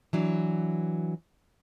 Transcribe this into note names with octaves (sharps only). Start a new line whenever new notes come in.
E3 F#3 D4